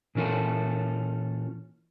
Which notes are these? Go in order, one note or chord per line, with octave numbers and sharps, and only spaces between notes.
A#2 E3 C#4 F4 A4